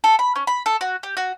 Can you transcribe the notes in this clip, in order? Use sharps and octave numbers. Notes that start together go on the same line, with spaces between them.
A4
B5
C#4
B5
A4
F#4
G4
F#4